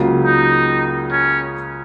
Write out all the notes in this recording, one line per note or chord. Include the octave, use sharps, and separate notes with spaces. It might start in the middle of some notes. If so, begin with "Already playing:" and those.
Already playing: C#2 C#3 F#3 A#3 F4
D#4
C#4